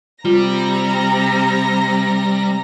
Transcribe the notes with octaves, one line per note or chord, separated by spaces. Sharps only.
C3 G3 F4 A#5 A#6